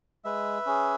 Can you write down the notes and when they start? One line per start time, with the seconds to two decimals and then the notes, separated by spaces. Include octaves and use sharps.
0.25 G#3 B4 E5
0.66 C#4 G#4